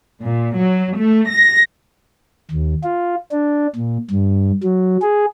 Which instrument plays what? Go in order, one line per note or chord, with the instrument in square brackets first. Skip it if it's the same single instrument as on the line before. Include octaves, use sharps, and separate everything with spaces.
[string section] A#2
F#3
A3
A#6
[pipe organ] D#2
F4
D4
A#2
G2
F#3
G#4